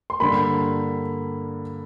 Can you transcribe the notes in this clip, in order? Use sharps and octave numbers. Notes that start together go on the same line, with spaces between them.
C6
G2 D3 G3 A#3 B5